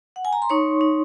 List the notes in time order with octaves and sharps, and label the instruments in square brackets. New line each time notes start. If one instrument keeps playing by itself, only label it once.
[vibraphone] F#5
G#5
A#5
C6
D#4 C#5 C#6
D#4